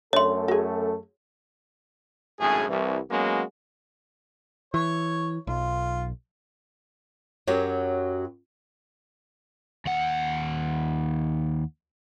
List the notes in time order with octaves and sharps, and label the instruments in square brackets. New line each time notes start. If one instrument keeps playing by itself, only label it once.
[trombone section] F#2 A3 A4 [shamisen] D4 E5 [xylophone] C#5 C6
[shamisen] F#4 G#4
[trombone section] G#1 F#2 A2 G#4
C2 E3
F#3 G#3 A#3 B3 C#4 F#4
[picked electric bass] E3 [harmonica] C#5
[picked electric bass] B1 [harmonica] F4
[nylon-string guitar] F#2 F#3 F#4 G4
[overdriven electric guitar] D#2 F#5